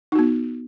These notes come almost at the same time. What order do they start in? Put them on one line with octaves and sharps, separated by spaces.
D#4 F#4 B3